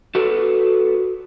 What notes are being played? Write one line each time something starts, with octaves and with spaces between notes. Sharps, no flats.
F#4 A4 B4